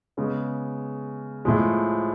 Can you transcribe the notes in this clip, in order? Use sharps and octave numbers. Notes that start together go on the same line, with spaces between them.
C#3 G#3 B3
A2 F3 G#3